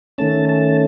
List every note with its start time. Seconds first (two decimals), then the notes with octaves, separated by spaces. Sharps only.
0.18 D#3 A3 C#4 A5
0.49 A5